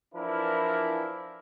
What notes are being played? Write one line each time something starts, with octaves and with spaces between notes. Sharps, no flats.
E3 F3 D4 E4 A#4